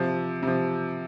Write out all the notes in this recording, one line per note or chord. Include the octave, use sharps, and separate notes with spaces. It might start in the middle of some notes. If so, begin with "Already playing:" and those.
Already playing: C3 F3
C3 F3